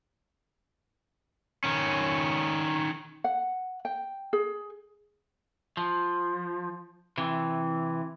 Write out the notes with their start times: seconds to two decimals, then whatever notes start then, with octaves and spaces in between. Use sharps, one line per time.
1.64 D#3 C#4
3.24 F#5
3.85 G5
4.33 G#4
5.77 F3
7.18 C3 E3